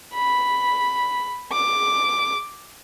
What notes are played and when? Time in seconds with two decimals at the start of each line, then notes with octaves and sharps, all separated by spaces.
0.14 B5
1.52 D6